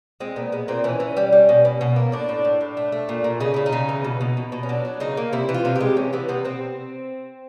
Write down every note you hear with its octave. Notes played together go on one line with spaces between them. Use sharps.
G#3 C4
A#2 B3
G#3 B3
A#2 C4
E3 C#4
E3
G3
G3
B2
B2
B2
A#3
A2 D4
A2
A2
A2
A3
A3
A#2
A#2
C#3 D#4
C#3 E4
D#4
C#3
E3
B2
B2
B2
B2
C#4
F#3 D4
F#3
C#3 D#4
A#3
C3 E4
E3
F4
C3
G#3 G4
E3 C#4
E3 B3
C3 B3
C3 C4